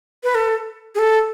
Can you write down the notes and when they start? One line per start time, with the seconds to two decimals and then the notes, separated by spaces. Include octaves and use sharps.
0.24 B4
0.35 A4
0.95 G#4
0.99 A4